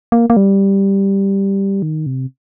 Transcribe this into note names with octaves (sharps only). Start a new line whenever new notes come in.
A#3
A#3
G3
D#3
C3